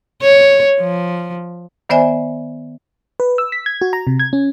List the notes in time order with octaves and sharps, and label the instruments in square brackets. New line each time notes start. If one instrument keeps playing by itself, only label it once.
[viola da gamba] C#5
F3
[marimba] D#3 B3 C5 D5 E5 G#5
[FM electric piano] B4
E6
B6
G#6
F#4
A#5
C3
G#6
C#4